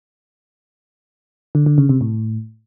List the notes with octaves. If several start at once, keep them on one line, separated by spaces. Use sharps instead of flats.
D3
D3
C#3
C3
A2